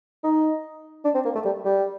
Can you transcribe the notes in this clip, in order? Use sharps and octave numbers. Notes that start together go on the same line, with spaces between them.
D#4
D4
C4
A#3
A3
G3
G3